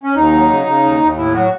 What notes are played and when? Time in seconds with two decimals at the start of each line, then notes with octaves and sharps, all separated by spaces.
0.03 C#4
0.15 D#2 D#4
0.32 F#3
0.50 C#3
0.66 C#3
0.84 D#2
1.01 D#2
1.17 A2 E4
1.34 F#3 F#4